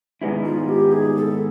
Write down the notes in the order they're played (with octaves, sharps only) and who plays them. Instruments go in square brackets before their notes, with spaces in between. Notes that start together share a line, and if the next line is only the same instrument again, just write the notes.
[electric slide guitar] G#2 D#3 G#3 B3 E4
[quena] F4
G4
G#4
A4